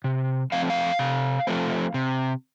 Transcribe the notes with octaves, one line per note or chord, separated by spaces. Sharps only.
C3
F3 A3 C4 F5
F5
C3
F3 A3 C4
C3